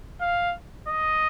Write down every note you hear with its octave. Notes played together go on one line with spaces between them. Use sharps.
F5
D#5